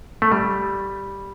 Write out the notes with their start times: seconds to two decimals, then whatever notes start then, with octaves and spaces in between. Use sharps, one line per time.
0.22 A3
0.32 G3